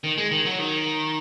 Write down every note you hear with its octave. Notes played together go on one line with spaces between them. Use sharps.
D#3
G#3
D#3
F#3
D#3